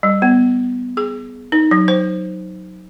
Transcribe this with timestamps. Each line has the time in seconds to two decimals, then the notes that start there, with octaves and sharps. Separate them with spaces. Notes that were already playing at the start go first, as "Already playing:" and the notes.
0.03 G3
0.22 B3
0.97 G#4
1.52 D#4
1.71 F#3
1.88 C5